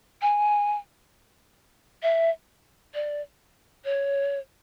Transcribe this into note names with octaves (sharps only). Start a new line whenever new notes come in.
G#5
E5
D5
C#5